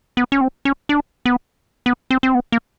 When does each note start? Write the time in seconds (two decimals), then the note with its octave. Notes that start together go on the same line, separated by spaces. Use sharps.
0.17 B3
0.32 C#4
0.41 C4
0.65 C#4
0.89 D4
1.26 B3
1.86 B3
2.11 C4
2.23 C4
2.35 B3
2.52 A#3